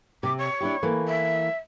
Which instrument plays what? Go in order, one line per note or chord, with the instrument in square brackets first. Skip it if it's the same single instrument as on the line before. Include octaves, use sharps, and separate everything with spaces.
[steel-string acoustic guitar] C3 [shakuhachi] D6
[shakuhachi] C#5
[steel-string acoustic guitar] D4 E4 G4
E3 A3 A#3
[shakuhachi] E5